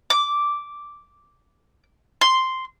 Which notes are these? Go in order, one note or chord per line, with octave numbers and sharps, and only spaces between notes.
D6
C6